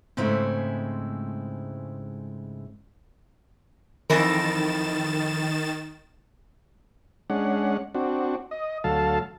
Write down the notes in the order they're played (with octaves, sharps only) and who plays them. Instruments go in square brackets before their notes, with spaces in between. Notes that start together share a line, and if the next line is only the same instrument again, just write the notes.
[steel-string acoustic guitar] G#2 C#3 G#3 A3 C4 E4
[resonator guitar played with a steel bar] F2 E3 A#4 [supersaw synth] D#3 A6 E7
[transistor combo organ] G#3 C#4 D4 F#5
C4 D4 F#4
D#5
D2 F#3 A4 F5 A5